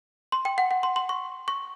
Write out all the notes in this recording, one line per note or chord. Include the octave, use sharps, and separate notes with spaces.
C6
G5
F#5
F#5
C6
C6
C#6
C#6